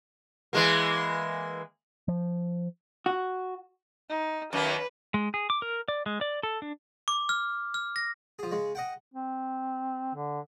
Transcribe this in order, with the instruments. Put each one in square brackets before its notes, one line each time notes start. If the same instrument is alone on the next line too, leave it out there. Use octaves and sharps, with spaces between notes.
[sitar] E3 G#3 A#3
[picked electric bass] F3
[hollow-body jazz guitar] F#4
[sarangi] D#4
[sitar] F#2 D#3 A#3 [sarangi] B4
[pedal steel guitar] G#3
G#4
D6
A#4
D5
G#3
D5
A4
D4
[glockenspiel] D6
F6
F6
A#6
[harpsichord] F3 G#4
C#3 G#3
D#5 F#5 G5
[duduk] C4
D3